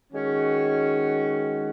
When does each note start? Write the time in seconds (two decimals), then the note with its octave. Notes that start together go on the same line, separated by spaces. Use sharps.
0.12 D#3 G#3 C#4 F#4